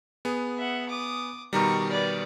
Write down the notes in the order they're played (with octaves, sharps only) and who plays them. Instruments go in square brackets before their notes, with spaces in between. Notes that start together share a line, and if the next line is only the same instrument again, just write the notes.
[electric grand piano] B3 G#4
[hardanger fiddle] E5 F#5
D6 D#6
[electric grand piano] B2 D#3 G3 [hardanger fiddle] A#5 C#6
[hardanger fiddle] B4 D5